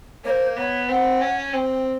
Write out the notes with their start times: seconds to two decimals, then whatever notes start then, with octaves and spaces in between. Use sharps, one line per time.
0.25 A#3 C#5
0.30 C5
0.57 B3 C#5
0.89 C4 F#5
1.21 C#4
1.53 C4 G5 G#5